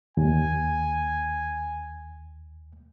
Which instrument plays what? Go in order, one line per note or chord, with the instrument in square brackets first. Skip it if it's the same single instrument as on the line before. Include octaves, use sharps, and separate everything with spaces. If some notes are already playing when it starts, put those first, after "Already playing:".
[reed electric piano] D#2 [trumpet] G#5